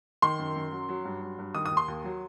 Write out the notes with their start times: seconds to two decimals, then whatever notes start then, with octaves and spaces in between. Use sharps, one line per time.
0.22 D#3 C6
0.39 F#2
0.56 F#2
0.72 F#3
0.89 F#3
1.05 G2
1.22 F#3
1.39 G2
1.55 D#3 D#6
1.66 D#6
1.71 D#2
1.77 C6
1.88 D#2
2.04 F#3